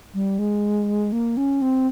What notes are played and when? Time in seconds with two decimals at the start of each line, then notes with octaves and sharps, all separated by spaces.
0.14 G3
0.39 G#3
1.12 A#3
1.37 C#4
1.62 C4